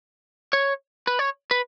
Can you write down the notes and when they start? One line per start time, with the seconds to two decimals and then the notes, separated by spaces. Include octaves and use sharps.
0.53 C#5
1.07 B4
1.19 C#5
1.51 B4